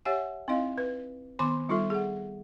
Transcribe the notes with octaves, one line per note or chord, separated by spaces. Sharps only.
G4 C#5 E5 F#5 G#5
C4 D#4 E4 D#5 F5
B4
D#3 B3 G#5 B5 C6 D6
G3 D#4 F4 A4 E5
G#4 F#5